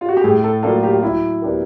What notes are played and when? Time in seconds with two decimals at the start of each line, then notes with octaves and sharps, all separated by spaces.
0.01 F4
0.09 F#4
0.17 G4
0.24 A2 G#4
0.44 A4
0.63 F#3 A#3 D4 F4 A4
0.83 G4
1.02 F#3 E4
1.42 B3 D4 G4 A#4